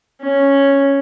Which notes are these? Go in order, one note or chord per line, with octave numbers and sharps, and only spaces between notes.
C#4